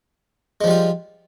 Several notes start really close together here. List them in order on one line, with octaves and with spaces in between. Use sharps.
G#3 F3 G3 F4